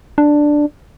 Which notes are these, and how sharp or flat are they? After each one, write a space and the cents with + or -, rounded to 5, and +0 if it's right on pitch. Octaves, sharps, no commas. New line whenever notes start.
D4 +5